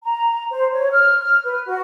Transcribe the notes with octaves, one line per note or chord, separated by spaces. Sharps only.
A#5
C5
C#5
F6
F6
B4
F#4